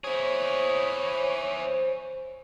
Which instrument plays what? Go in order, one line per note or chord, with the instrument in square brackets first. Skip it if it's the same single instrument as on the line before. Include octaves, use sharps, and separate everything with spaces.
[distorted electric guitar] E4 G#4 [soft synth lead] C5 [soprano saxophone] C#5